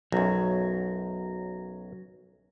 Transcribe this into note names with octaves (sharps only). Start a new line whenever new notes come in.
B1 F#2 F#3